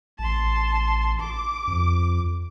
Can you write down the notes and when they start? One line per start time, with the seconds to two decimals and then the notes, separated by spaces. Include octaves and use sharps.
0.19 A1 A5 C6
1.20 D6
1.67 F2